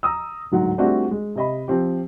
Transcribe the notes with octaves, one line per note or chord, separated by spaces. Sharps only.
A#5 D#6 E6
D1 G#2 F#3 F#5
G3 A3 C4 D4 F4 F#4
G#3
C3 D#5 B5
F3 C4 G4